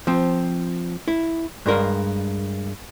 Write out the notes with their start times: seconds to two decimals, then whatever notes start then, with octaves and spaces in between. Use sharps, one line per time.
0.07 F3 C4
1.08 E4
1.66 G2 G#3 A#4 F5